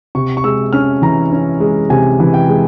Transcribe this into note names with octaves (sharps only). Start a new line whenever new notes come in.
C3 C#6
C#6
G#3 E6
C#4 F6
E3 A#5
C#4
G#3
C3 G#5
E3
G5
G#3